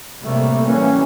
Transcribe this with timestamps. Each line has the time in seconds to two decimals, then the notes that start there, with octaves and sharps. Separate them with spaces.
0.23 A2 C3 G3 A3 A#3
0.63 E3 G3 A#3 C#4